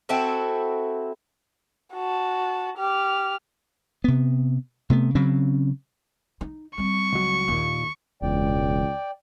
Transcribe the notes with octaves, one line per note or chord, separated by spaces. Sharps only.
C4 E4 F#4 A4
F#4 A5
G4 F6
C3 B3
C3 A3 B3
C#3 F#3 C4 C#4
D#4
G3 C4 C#6
C#2 F#3
D#2 A#2 D#3
E1 C#2 D5 G5